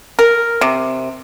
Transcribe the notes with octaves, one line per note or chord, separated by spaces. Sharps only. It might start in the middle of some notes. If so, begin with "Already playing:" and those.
A#4
C3